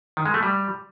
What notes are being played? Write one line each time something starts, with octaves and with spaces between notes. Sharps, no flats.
D#3
G#3
A3
G3